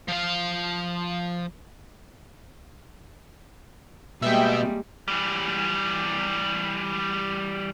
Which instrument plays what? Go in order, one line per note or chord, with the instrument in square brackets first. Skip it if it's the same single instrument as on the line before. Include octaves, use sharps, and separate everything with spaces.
[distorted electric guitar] F3 F5
[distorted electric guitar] B2 [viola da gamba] G3 G#3 A#3 [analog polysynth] E5 G5
[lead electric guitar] E3 G3